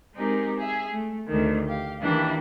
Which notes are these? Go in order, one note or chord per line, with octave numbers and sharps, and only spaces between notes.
G#3 C4 D#4 G4 G#4 A#4
G#4 E5
A3
D2 D#3
G4 F5
D#3 E3 A#3 D4 E4 G4